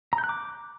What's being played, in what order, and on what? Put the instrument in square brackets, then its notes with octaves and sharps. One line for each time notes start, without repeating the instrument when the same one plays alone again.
[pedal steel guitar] A#5
G6
F#6
D6